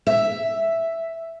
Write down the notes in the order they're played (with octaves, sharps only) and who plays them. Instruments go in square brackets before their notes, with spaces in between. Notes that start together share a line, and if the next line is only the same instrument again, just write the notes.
[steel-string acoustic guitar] E5